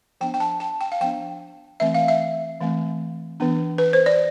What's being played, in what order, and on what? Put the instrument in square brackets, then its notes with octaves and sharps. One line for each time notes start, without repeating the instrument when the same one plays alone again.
[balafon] F3 B3 D4 G5
G5
A5
A5
G5
F5
F3 B3 D4 G5
E3 A3 C4 E5
F5
E5
E3 A3 C4
E3 B3 D4
B4
C5
D5